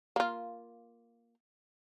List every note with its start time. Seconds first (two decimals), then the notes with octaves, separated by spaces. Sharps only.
0.16 A#3 F4